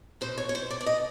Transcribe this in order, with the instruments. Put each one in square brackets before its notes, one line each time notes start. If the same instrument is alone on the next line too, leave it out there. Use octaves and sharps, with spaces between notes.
[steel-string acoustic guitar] B2 C5
C#5
C#5
C5
D5
D5
D#5